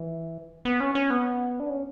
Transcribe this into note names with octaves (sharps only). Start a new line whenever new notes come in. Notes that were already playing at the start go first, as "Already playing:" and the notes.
Already playing: E3
B3
C#4
C#4
B3
D4
C#4